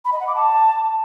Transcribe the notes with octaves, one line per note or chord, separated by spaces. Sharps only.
B5
D#5
F#5
D6
A5